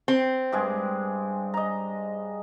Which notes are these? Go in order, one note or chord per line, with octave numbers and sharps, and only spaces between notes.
C4
G2 G#3 G#4
D#5 A#5